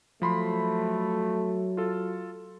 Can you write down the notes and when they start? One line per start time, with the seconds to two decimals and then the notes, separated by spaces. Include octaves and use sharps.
0.22 F3 F#3 A3 B5 C6
1.77 F4 A4